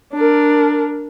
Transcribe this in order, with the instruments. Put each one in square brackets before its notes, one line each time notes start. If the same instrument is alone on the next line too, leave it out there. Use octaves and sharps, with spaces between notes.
[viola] D4 A#4